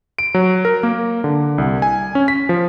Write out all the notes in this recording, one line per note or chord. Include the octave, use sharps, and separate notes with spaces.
D7
F#3
A#4
A#3
D3
C2
G#5
C#4
B6
F3